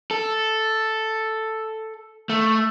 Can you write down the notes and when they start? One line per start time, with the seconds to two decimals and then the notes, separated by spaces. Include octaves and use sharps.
0.11 A4
2.30 A3